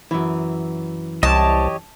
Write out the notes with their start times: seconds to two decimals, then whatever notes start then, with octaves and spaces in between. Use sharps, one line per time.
0.11 F#2 E3
1.23 C2 G4 C#5 D#5 A5